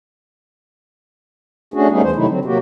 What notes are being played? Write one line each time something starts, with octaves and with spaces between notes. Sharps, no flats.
A3 C#4 D4 F#4 G#4
G3 A3 B3 C#4 D#4 G#4
E2 E3 C5
C3 D#3 F#3 A3 D#4 E4
D3 F#3 C4
C3 F#3 A#3 F#4 G4